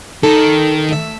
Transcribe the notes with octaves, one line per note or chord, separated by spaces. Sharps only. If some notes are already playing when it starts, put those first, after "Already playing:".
D#3 A4
A3 E5